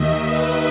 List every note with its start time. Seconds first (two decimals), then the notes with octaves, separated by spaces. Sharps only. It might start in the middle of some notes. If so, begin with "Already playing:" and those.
Already playing: D#2 D#3 D#5 E5
0.24 B4